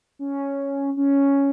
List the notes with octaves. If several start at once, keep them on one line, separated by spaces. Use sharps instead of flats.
C#4
C#4